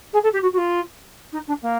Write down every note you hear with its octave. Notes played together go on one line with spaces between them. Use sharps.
G#4
A4
G4
F#4
F#4
F4
D#4
D4
A#3